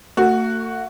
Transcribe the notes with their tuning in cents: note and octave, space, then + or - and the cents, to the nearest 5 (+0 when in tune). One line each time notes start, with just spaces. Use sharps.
A3 +40 F#4 -5